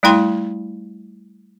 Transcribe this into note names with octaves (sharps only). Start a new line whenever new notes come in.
G3 A3 E4 G5 C6